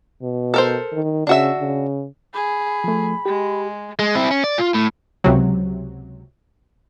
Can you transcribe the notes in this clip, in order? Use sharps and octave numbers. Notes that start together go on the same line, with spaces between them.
B2
A4 A#4 C5
D#3
C#3 D4 F#4 E5
C#3
G#4 B5
F3 A3
G#3 G4
G#3
C4 E4
C#4
D5
F4
A2
C#2 C3 F#3